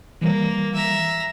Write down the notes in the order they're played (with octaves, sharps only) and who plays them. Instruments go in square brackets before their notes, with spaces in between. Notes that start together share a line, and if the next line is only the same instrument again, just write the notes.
[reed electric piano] E3 G3 [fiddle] A#3
[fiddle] E5 A#5